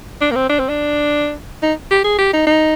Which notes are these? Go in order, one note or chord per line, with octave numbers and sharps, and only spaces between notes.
D4
A#3
C4
D4
C4
D4
D#4
G4
G#4
G4
D#4
D#4